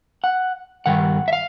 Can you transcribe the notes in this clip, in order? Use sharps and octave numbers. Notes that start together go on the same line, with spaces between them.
F#5
G2 D#3 F#5
E5
F5